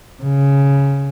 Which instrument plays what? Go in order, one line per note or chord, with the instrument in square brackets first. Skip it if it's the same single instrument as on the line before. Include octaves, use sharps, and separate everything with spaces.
[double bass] C#3